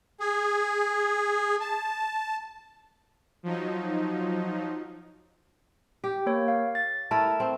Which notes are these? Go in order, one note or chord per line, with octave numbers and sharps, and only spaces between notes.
G#4
A5
F3 F#3 D#4
G4
A#3 C#5
F5
A6
A3 E4 A#4 A5
C4